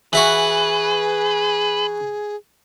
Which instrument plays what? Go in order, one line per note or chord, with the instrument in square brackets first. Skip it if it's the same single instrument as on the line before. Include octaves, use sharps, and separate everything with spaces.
[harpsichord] E3 E4 F#4 [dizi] G#4 [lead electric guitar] B4